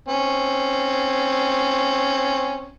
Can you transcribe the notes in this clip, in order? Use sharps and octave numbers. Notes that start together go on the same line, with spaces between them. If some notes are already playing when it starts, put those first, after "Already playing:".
C4 C#4